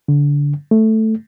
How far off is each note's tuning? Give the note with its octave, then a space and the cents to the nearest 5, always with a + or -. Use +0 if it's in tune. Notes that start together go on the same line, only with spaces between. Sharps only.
D3 -25
A3 +0